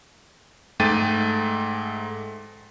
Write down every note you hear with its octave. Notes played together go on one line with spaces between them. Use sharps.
G#2 G#3 A3 G5 A6 D#7